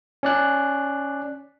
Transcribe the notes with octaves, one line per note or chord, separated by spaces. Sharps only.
C#4 D5 F#6